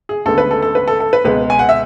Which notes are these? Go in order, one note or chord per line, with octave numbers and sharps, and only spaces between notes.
G#4
D2 C#3 G#3 B3 A4
B4
A4
A4
B4
A4
A4
B4
C#2 B2 G#3 B3 B4
G#5
F#5
E5